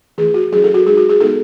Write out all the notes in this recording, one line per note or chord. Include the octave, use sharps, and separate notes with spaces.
E3 A3 E4 G#4
F#4
F#3 C#4 E4 G#4
A4
F#4
G#3 D#4 G#4
F#4
G#4
G#3 B3 D#4 A4